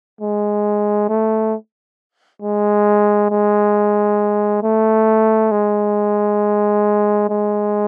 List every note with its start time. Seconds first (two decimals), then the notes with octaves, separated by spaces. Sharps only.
0.21 G#3
1.09 A3
2.42 G#3
3.30 G#3
4.63 A3
5.51 G#3
7.29 G#3